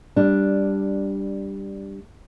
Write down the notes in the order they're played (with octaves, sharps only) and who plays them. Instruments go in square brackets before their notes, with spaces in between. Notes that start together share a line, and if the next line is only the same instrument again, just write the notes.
[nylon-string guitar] G3 D4